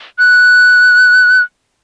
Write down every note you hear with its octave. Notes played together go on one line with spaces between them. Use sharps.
F#6